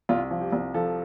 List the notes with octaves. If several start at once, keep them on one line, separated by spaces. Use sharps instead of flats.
C2 F4
F3
G4
C2
F3 A4